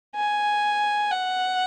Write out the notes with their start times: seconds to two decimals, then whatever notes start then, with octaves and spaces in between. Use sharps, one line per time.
0.16 G#5
1.12 F#5